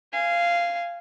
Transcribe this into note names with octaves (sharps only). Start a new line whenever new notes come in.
F5 G#5